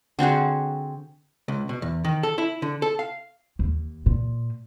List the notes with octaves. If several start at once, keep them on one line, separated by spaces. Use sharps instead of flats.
D3 C4 F#4 G#4
C#2
B2
E2
D#3
A4
E4
D3
A4
F5
D#2
A#2